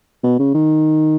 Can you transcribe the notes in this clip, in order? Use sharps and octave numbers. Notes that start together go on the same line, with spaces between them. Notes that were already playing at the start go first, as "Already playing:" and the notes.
B2
C#3
D#3